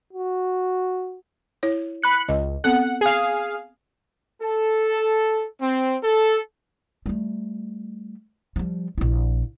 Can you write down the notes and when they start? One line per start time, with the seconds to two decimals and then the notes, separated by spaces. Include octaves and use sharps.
0.13 F#4
1.63 E4 C#5
2.02 B5 F#6 C#7
2.28 C#2 D#5
2.64 B3 C4 A4 F#5
3.01 G#4 F5
4.41 A4
5.60 C4
6.03 A4
7.06 G3 A3
8.56 F3 G3
8.98 A#1 E4